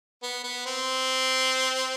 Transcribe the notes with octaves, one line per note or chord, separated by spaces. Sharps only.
B3
B3
C4